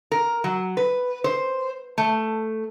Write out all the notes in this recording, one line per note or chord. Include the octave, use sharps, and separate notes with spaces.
A#4
F#3
B4
C5
A3